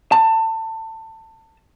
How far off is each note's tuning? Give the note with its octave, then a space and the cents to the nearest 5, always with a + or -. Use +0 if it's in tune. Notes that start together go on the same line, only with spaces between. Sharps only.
A5 +25